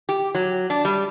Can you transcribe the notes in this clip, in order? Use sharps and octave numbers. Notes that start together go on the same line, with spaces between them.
G4
F#3
D4
G3